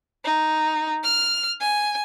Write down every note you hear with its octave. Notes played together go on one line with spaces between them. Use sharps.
D#4
F6
G#5